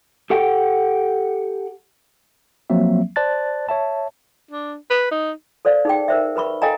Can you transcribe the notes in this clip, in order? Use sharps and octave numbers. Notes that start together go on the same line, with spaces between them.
G4 A4 F#5 G5
F3 F#3 A#3 C4 E5
C5 D5 A5 F#6 A6
C#5 E5 A5
D4
B4
D#4
A4 C5 D5 F5
D#4 G#4 G5
A#4 C5 E5
A#4 B4 B5 C#6
A4 D#5 F5 G5 G#5 A#5